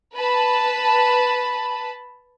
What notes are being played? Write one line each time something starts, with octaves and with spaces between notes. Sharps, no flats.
B4 A5 B5